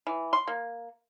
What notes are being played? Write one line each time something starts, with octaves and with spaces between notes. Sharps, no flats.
E3
C6
A#3